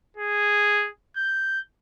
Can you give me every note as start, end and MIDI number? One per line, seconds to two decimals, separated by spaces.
0.17 0.89 68
1.16 1.59 91